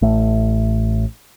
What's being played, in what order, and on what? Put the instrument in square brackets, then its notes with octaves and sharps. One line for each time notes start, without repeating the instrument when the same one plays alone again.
[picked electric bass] A1 A3